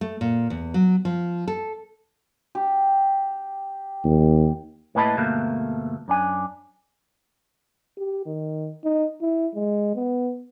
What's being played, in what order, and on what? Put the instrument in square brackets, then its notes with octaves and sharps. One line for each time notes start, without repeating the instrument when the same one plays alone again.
[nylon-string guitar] A3
A#2
E2
F#3
F3
A4
[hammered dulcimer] G4
[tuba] D#2
[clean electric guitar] A2 A#3 B4 D#5 A5 B5
D2 G2 B2 A3 A#3
F#2 D4 G#5
[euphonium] G4
D#3
D#4
E4
G#3
B3